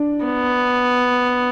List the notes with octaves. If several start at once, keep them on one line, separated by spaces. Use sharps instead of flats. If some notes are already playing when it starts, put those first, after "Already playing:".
Already playing: D4
B3